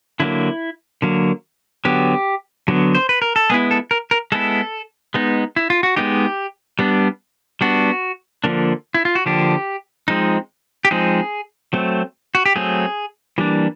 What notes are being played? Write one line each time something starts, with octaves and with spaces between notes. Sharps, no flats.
D3 F#3 A#3 E4
D3 F#3 A#3
D3 F#3 B3 G4
D3 F#3 B3
C5
B4
A#4
A4
G#3 B3 E4 G#4
A4
A#4
A#4
G#3 B3 E4 A4
G#3 B3 D#4
E4
F4
F#4
G#3 B3 D#4 G4
G3 B3 D4
G3 B3 D4 F#4
D3 F3 A#3 D4
E4
F4
F#4
D3 F3 A#3 D4 G4
F3 G#3 C4 D#4
G4
F3 G#3 C4 D#4 G#4
F#3 A3 C4
F#4
G4
F#3 A3 C4 G#4
E3 G3 A#3 D4